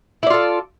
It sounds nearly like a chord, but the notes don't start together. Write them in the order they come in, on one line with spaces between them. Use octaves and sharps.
E4 D5 F4 A4